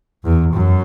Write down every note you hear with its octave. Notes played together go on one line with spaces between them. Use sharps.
E2
F#2